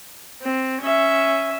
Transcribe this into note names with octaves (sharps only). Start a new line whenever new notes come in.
C4
C#4 E5